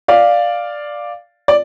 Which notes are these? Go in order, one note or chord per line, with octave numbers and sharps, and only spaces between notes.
D5 F5
D5